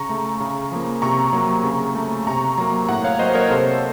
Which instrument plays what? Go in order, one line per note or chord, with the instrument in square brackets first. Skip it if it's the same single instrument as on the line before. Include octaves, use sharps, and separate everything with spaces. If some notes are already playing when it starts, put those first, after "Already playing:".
Already playing: [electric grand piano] C#3 A#5 C#6
A3
C#3
F3 A#3
C3 A#5 C#6
F#3 A#3
C#3
A3
C3 A#5 C#6
F#3 A#3 A#5 C#6
A2 F#5 A#5
C#5 F5
F#3 A#3 C5 D#5
A#4 C#5
C3 A4 C5